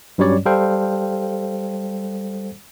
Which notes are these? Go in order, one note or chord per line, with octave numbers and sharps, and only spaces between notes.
G2 F#3 G3 C#4 C#5 D5
G3 A4 C5 F5 G5